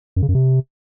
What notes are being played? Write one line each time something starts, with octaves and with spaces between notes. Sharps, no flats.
F#2
C#3
F#2
C3